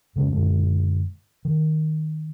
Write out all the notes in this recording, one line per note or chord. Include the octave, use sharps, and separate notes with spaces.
F2 C#3 G#3 C#4
F#2 A#2 D3 G#3
D#3